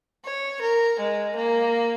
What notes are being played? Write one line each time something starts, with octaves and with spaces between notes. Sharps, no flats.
C#5
A#4
G#3
A#3